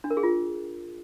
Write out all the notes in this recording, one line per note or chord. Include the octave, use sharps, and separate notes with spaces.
D4
A#4
G#4
F4